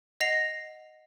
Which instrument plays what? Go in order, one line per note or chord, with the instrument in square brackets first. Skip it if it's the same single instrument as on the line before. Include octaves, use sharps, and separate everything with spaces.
[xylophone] D#5 F#5 A#6 C7 F7